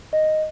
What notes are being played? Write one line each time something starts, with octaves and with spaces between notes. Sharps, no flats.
D#5